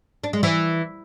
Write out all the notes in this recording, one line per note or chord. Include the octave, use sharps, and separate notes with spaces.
D4
G#3
E3